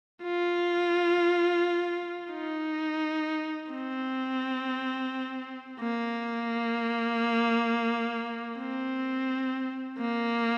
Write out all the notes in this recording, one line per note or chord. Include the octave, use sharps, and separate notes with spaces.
F4
D#4
C4
A#3
C4
A#3